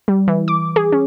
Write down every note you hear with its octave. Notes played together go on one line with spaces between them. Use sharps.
G3
E3
D6
G#4
C#4